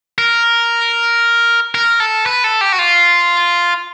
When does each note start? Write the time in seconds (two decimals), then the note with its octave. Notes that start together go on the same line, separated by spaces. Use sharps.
0.18 A#4
1.75 A#4
2.00 A4
2.26 B4
2.44 A4
2.61 G4
2.72 F#4
2.79 F4